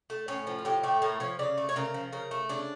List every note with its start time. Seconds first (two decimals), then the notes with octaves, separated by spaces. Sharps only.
0.10 A3
0.28 A2 C#4
0.47 F3
0.58 F4
0.65 A2 G4
0.83 A3 G4
1.02 A2 A#4
1.20 F3 C#5
1.39 C#3 D5
1.58 A3
1.69 C#5
1.76 C#3 A#4
1.94 F3
2.13 C#3 A#4
2.31 A3
2.49 C#3 D4